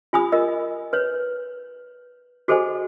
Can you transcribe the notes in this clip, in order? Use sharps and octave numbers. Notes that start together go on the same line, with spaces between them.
F4 G#5 B5 D#6
F4 A#4 D#5
B4 C#5
F#4 G#4 A4 C5 D#5 G#5